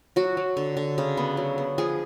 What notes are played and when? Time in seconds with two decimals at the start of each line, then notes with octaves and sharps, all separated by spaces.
0.16 F#3 F#4
0.37 F#3
0.57 D3
0.77 D3
0.98 C#3
1.17 B3
1.37 F#3
1.58 B3
1.78 F3 G#4